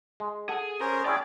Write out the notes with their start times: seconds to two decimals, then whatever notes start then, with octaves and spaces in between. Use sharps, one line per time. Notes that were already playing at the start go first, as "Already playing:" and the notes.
0.20 G#3
0.49 G#4 A4 F#5
0.80 C#4 G#4 A#4 C5
1.05 C#4 E4 G#4 D5 G5